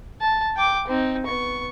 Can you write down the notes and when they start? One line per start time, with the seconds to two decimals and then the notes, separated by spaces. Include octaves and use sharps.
0.21 A5
0.57 G5 D6
0.88 C4 D#4
1.26 B3 C#6